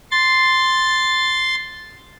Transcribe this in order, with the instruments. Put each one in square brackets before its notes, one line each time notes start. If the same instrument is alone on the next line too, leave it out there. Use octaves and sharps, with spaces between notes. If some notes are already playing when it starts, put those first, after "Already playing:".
[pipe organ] C6 A6